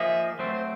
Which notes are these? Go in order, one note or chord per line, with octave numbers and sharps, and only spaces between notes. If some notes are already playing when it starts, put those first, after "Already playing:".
Already playing: F3 A#3 D#4 G#4 E5
F#3 A3 C4 C5
C5